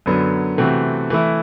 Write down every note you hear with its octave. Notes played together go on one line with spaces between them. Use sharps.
F#2 D3 F#3 B3
C3 E3 A3 C4 F#4
E3 A3 E4